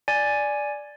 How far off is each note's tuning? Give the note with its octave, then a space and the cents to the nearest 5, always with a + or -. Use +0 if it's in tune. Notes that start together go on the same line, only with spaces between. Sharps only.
D5 +0 G#5 +0